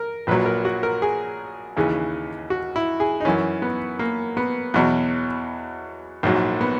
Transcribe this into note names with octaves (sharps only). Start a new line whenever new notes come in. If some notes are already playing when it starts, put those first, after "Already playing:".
Already playing: A#4
A#1 A#2 F#3 B4
A#4
F#4
A#4
G#4
D#2 C#3 E3
F#4
E4
G#4
D#4
F#2 E3 C#4
B3
A#3
B3
E2 B2 F#3
A#1 G#2 F#3 A#3
B3